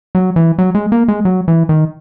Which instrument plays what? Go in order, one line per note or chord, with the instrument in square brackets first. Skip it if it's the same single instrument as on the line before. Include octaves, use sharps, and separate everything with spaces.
[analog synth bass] F#3
E3
F#3
G#3
A#3
G#3
F#3
E3
D#3